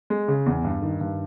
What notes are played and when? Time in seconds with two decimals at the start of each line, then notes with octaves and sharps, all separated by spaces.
0.10 G#3
0.28 C#3
0.46 E2
0.64 G2
0.82 D#3
1.01 G2